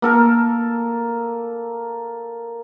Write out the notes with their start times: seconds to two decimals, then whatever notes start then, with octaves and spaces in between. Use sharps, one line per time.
0.02 A#3 A4 A#4